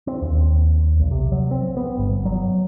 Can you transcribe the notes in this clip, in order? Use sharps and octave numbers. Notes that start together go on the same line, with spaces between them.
C4
D#2
B1
C3
F#3
C4
B3
G1
F#3